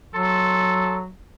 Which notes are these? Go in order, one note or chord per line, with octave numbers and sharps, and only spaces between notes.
F#3 A4 C6